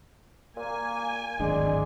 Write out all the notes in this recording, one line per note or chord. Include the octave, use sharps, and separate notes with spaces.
A#2 A#3 G#5
D1 G#1 G#3 D4 D5